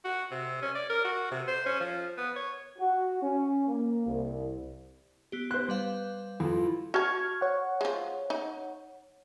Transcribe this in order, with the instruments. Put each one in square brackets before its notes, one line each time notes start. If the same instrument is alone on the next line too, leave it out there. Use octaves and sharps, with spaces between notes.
[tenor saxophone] F#4
C3
C#4
D5
A#4
F#4
C3
C5
C#4
F3
B3
C#5
[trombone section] F#4
C#4
A#3
C2
[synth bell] B3 G4
[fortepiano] C5 F#6
[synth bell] G3 B4 F5
[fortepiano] F2 [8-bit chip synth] E4 F4
[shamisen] F#4 A5 [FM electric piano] C#6 F6 G#6
[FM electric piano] C#5 F#5
[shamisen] F3 G#3
D#4